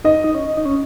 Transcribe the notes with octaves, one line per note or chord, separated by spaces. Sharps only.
D#4 D#5
D#4
C#4
D#4
C#4